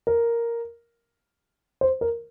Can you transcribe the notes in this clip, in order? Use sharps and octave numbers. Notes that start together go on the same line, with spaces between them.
A#4
C5
A#4